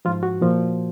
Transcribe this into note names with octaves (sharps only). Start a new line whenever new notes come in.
G#2 F3 F4
F#4
A#2 F3